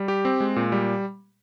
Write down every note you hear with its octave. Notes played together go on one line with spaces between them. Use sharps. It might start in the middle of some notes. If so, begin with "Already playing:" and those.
Already playing: G3
G4
C4
G#3
A#2
G3